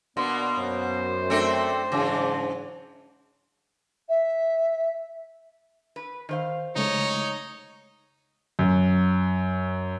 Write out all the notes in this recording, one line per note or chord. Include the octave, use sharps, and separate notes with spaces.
B2 A#3 B3 D4 C6
F#2 C5
A3 C4 D4 A4
G#2 C#3 E3 F#3 D4
E5
B4
D#3 C5 F5
C#3 G#3 A3 D#4 C#5
F#2